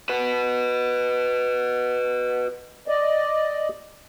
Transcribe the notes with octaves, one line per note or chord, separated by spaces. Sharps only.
F#4 B4
D5 D#5